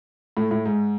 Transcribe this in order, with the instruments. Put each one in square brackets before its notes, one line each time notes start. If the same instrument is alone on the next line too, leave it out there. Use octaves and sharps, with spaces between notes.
[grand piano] A2
A2
G#2